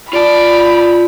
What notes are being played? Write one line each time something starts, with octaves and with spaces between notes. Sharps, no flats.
F4 D5 A5 B5